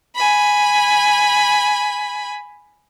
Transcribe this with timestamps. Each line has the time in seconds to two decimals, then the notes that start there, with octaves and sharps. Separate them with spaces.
0.16 G#5 B5